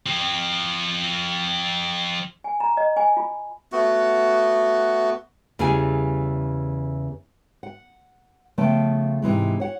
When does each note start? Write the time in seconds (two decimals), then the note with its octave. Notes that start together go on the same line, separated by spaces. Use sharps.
0.06 F3 C4
2.44 G#5
2.60 A#5
2.77 D#5
2.97 G#5
3.17 F4
3.72 A3 B3 F#4
5.59 E2 C#3 E3 G3 G#4 G#5
7.63 F#5
8.58 C#3 F3 A3 B3 G5 A5
9.22 G#2 C3 E3 G#3
9.60 C#5 F#5